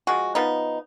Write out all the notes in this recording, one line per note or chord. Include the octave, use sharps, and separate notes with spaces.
F3 G#3 F#4
F3 B3 D#4